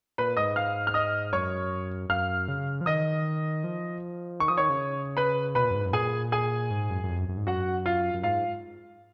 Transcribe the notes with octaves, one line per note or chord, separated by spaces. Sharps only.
A#2 B4 B5
G#2 D#5 D#6
F5 F6
F6
D#5 D#6
F#2 C#5 C#6
F#2 F5 F6
C#3
F3
D#3 D#5 D#6
F3
D#3 C#6
F3 D#6
D#3 C#5 C#6
C#3
B4 B5
B2 B4 B5
A#2
F#2
G#2
F#2
A#2 G#4 G#5
G#4 G#5
G#2
F#2
F#2
F2
F#2
F#2
G#2
F#2 F#4 F#5
F4 F5
F#2
G#2 F4 F5